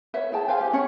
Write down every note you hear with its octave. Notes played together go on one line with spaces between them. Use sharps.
B4 C#5 E5
E4 G#4 G5 A5
B4 C5 F5 G#5
G4
C#4 C#5